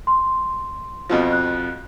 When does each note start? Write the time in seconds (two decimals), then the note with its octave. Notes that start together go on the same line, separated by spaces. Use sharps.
0.07 C6
1.09 F2 B2 F3
1.32 F#6